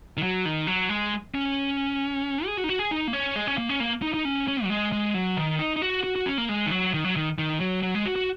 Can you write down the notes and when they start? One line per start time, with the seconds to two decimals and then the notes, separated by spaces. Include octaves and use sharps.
0.17 D#3
0.23 F#3
0.45 D#3
0.67 F#3
0.89 G#3
1.35 C#4
2.46 G#4
2.57 F#4
2.64 D#4
2.69 F#4
2.79 G#4
2.91 D#4
3.08 A#3
3.13 C#4
3.36 G#3
3.47 C#4
3.58 A#3
3.69 C#4
3.80 A#3
4.02 D#4
4.14 D#4
4.25 C#4
4.48 C#4
4.64 F#3
4.70 G#3
4.92 G#3
5.14 F#3
5.37 D#3
5.59 D#4
5.76 D#4
5.82 F#4
6.04 F#4
6.16 F#4
6.26 C#4
6.38 A#3
6.49 G#3
6.66 D#3
6.71 F#3
6.94 D#3
7.04 F#3
7.16 D#3
7.38 D#3
7.60 F#3
7.83 F#3
7.95 G#3
8.06 F#4
8.16 F#4